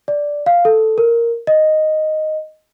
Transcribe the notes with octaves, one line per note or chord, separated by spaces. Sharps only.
D5
F5
A4
A#4
D#5